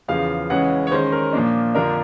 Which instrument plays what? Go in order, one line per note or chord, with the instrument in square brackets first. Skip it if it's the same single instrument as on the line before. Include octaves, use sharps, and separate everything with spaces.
[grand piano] E2 C#3 F3 F5
C#3 E3 G#3 C#4 F#5
C#5
D#3 G#3 C#4 C5
A#4
A#2 F3 A#3 D4
F2 D3 F3 A#3 D4 A#4